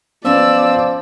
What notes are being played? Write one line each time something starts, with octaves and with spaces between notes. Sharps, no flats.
F3 B3 C#4 B4 D5 E6